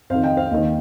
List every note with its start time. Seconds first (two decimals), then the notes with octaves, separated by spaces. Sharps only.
0.10 F2 D#3 C5 F5
0.24 D#5 G5
0.37 C5 F5
0.51 D#2 D#3 D#5